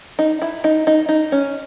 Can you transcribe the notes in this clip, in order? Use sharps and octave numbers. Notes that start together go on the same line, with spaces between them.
D#4
E4
D#4
D#4
D#4
C#4